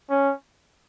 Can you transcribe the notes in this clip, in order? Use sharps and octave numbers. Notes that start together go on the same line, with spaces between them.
C#4